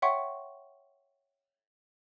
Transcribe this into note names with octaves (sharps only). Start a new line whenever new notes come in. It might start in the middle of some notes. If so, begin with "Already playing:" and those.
C#5 E5 F#5 G5 C6 C#6